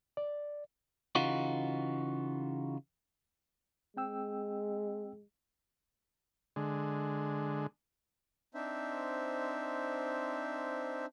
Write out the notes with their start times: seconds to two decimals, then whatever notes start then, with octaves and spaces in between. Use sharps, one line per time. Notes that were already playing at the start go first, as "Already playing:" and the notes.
0.17 D5
1.15 C#3 E3 D#4 F4 F#4
3.97 G#3 C4 G5 E6
6.56 D3 G#3
8.54 C4 D4 D#4 C5 E5